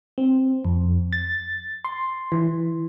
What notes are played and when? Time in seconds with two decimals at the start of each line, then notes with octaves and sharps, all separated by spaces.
0.18 C4
0.65 F2
1.13 A6
1.85 C6
2.32 E3